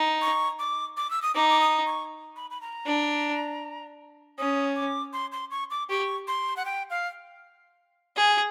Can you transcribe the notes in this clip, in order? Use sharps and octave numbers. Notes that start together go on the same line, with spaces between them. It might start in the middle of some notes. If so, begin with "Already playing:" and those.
Already playing: D#4
C#6
D6
D6
E6
D#6
D#4 D6
D6
D#6
C#6
B5
B5
A#5
D4
C#4 D#6
D6
C6
C6
C#6
D6
G4 C#6
C6
F#5
G5
F5
G#4